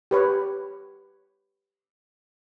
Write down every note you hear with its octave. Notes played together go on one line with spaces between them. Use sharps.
G4 B4 C#5